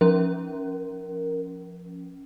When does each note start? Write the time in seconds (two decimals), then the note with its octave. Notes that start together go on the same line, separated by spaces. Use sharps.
0.01 F3 C#4 A#4